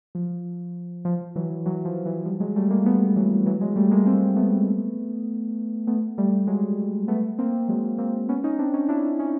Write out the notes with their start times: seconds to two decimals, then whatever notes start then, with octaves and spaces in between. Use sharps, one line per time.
0.15 F3
1.05 F3
1.36 E3 F#3
1.66 E3 F#3
1.85 F3
2.05 E3 F#3
2.25 F3 G3
2.40 F#3 G#3
2.56 G3 A3
2.70 G#3 A#3
2.86 A3 B3
3.16 E3 F#3
3.46 E3 F#3
3.61 F#3 G#3
3.76 G3 A3
3.91 G#3 A#3
4.06 A#3 C4
4.36 A3 B3
5.87 A3 B3
6.18 G3 A3
6.47 F#3 G#3
7.08 A3 B3
7.38 A#3 C4
7.68 F#3 G#3
7.98 A#3 C4
8.29 B3 C#4
8.44 C#4 D#4
8.59 C4 D4
8.74 C#4 D#4
8.89 D4 E4
9.19 C#4 D#4